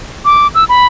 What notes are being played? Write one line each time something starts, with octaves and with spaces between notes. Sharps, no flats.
D6
E6
B5